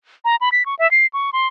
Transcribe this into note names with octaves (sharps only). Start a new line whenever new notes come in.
A#5
B5
B6
C#6
E5
C7
C#6
C6